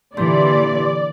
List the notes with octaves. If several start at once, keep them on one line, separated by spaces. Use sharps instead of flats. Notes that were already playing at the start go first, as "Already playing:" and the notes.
A#2 D3 E3 G4 D5 C6